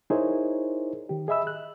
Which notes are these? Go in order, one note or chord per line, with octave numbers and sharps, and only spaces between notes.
D#4 E4 G#4 A#4 C5 C#5
D#3 G4
G#4 D#5 E5 B5 E6
F#6